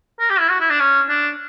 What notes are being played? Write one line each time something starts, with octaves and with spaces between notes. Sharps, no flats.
A#4
G4
E4
F#4
E4
D4
C#4
D4